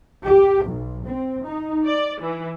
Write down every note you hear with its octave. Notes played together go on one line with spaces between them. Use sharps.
G4
B1
C4
D#4
D5
E3